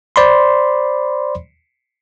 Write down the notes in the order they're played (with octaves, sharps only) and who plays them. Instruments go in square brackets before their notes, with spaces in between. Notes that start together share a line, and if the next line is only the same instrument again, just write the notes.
[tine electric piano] C5 D5 B5 C6